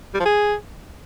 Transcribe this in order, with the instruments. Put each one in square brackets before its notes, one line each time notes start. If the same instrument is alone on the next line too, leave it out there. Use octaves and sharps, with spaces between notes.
[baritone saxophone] G3
F3
G#4